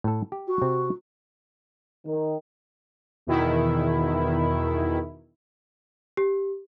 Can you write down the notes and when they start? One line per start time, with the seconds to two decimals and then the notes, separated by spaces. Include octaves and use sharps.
0.04 A2 A4
0.32 G4
0.48 F#4
0.62 C3 C4
2.06 D#3
3.27 E2 B2 D#3 E4
6.17 G4